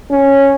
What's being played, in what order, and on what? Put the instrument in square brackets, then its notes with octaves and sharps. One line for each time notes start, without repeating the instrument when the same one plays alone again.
[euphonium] C#4